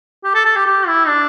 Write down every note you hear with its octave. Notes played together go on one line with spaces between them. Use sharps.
G4
A4
A4
G4
G4
E4
D4